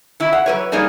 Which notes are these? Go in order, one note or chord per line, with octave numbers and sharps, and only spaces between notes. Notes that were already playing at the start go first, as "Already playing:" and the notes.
D#3 E4
F#5
F#3 B4 C#5
G3 A#3 D#4 G#4 A#4 D5